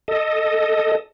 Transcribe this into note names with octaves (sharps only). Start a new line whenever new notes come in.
A4 D#5